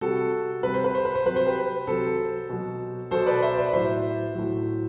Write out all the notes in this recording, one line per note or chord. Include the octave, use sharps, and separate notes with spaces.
C3 G3 F#4 A4
C3 G3 B4
C5
B4
C5
B4
C5
C3 F#3 B4
C5
G4 B4
C3 F#3 A4 C5
B2 F#3
B2 F#3 A4 C5
B4 D5
C5 E5
B4 D5
A2 F#3 C5 E5
A2 F#3